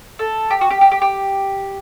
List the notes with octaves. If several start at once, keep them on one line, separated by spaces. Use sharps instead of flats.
A4
G4
F#4
G4
G4
G4
G4